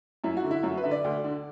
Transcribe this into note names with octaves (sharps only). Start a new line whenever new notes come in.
F#2 E4
F#4
D3
E4
F#2 F#4
B4
D3 E5
D5
D2
D3